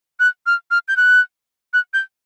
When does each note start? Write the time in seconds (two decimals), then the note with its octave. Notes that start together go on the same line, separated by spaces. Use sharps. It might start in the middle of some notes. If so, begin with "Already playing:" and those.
0.20 F#6
0.46 F6
0.71 F6
0.88 G6
0.97 F#6
1.73 F#6
1.94 G6